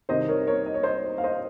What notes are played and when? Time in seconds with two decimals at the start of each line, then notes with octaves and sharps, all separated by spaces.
0.09 C2 C3 D#3 C5 D#5
0.28 A#4 C#5
0.47 A#4 C#5
0.66 D#5
0.74 C#5
0.83 C5 D#5
1.18 F5
1.24 C5 D#5